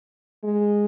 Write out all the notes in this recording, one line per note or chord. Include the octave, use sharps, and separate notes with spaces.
G#3